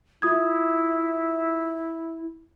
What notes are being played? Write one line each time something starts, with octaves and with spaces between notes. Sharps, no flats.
E4 F4 D#6 G#6